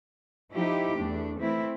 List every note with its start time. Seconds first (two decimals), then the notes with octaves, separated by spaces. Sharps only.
0.51 F3 D#4 E4 G4
0.98 E2 A3 D4
1.40 E3 A3 C4 E4